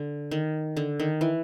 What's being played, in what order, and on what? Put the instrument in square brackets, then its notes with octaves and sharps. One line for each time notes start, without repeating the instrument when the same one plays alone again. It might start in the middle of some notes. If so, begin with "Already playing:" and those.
Already playing: [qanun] D3
D#3
D3
D#3
E3